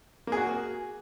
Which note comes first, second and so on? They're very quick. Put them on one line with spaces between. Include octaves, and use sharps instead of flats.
A#3 G#4 F#4